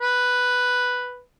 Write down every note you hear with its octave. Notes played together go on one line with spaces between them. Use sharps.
B4